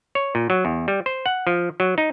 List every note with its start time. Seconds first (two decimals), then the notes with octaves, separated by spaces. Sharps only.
0.15 C#5
0.35 A#2
0.50 F#3
0.65 E2
0.88 G3
1.06 C5
1.26 F#5
1.47 F3
1.80 F#3
1.98 D#4